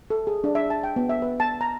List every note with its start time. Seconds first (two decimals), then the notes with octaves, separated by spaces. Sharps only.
0.10 A4
0.27 G#4
0.44 D4
0.55 E5
0.70 A5
0.84 G5
0.96 B3
1.09 E5
1.22 B4
1.40 A5
1.61 A#5